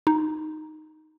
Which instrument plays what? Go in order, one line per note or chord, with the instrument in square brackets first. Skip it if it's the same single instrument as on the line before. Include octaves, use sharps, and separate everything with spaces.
[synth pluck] D#4